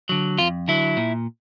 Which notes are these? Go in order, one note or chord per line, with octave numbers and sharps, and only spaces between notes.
D3 F#3
F2 F4
D3 F#3 E4
A#2